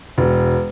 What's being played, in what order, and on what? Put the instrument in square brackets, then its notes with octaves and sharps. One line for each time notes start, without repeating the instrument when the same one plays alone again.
[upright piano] E1